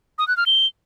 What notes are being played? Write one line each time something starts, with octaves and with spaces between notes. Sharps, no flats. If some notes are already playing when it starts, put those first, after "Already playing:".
D#6
F#6
F6
G7